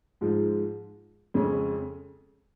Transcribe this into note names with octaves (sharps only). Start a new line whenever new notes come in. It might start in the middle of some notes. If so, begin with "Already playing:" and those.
G#2 F3 G#3
F2 C#3 G#3 C#4